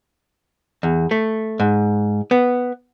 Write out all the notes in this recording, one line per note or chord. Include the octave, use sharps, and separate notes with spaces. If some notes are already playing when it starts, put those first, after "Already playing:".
E2
A3
G#2
B3